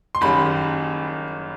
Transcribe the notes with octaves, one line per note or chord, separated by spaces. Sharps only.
C6
F#1 F#2 D#3 G3 B5